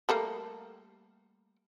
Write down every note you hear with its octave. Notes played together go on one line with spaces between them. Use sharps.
G3 A3 A#3